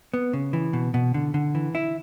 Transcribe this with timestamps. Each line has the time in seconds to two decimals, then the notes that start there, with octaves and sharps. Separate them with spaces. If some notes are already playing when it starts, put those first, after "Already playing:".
0.14 B3
0.33 C#3
0.53 E3
0.73 B2
0.94 B2
1.14 D3
1.34 D3
1.55 E3
1.75 E4